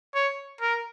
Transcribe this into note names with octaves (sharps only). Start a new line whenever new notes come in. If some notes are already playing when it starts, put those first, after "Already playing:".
C#5
A#4